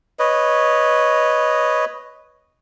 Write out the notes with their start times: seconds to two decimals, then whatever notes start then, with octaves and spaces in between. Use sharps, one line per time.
0.19 B4 C#5 D#5